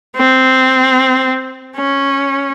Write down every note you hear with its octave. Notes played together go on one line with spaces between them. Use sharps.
C4
C#4